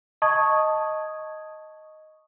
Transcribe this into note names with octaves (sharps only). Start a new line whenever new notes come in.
D#5 A5 C#6 D#6 G#6